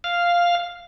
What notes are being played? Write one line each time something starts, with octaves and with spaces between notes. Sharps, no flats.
F5